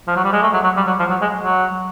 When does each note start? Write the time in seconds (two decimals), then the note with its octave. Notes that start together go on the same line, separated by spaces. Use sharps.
0.08 F3
0.16 F#3
0.25 G3
0.32 G#3
0.42 A3
0.53 F#3
0.64 F#3
0.76 G3
0.87 F#3
0.99 F3
1.09 F#3
1.21 G#3
1.44 F#3